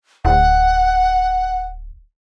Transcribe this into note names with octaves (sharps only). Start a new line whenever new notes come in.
D1 F#5